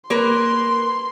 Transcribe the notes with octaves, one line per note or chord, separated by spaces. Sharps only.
A#3 A#4 B4 C6